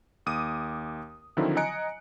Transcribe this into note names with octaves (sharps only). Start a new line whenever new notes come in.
D#2 D6 D#6 D#7
D3 D#3 F3 F#3 C4 E4
D#5 G#5 A#5 F#6 C#7 D7